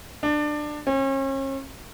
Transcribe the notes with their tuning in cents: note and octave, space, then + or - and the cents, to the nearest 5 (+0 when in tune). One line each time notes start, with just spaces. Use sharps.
D4 +20
C#4 -40